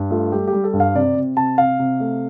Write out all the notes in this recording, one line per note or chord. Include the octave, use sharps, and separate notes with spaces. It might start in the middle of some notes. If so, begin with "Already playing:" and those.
Already playing: G2
A3 F4
G3 G4
G4
G3
A4
G2
F5
C3 D5
C3
C3 A5
C3 F5
C3
A3